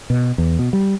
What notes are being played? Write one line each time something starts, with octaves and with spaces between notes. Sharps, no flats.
B2
E2
B2
G3